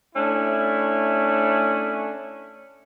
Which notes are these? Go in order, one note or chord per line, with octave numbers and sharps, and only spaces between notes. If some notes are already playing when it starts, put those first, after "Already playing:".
A3 C#4 D4 E4